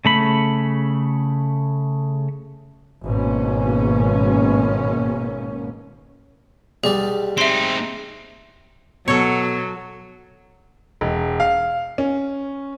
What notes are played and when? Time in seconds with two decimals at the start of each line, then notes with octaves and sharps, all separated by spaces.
0.05 C#3 A3 B5
3.04 G#1 B2 A#3 C#4
6.84 B1 G3 G#4 D5
7.38 C4 D#4 E5 C6
9.08 B2 F#3 A4 C#5
11.01 E1
11.40 F5
11.98 C#4